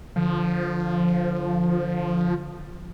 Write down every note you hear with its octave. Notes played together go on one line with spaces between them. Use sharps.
D3 F3